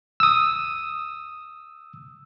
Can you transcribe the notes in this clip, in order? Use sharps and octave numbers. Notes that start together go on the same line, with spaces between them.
D#6 E6